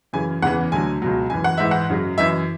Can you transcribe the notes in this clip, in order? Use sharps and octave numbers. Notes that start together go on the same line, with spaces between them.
F#2 C#3 E3 G#5
E2 C#3 E3 F#5
D2 D3 F#3 G#5
C#2 B2 F#3
F#2 E3 G#5
F#5
G#2 E3 E5
F#5
F#2 C#3 F#3
F#2 E3 E5